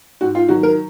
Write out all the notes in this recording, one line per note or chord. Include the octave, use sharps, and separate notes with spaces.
G#2 F#4
F4
D#3 F#3 F#4
A#4